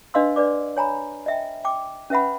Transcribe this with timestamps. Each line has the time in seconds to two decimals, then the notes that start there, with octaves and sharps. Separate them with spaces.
0.14 D4 B4 D#5 F5 C6 E6
0.36 D4 B4 D5 D6
0.77 C#5 G#5 A#5 B5
1.26 D#5 E5 G5
1.65 G5 D6
2.10 C#4 B4 E5 F#5 B5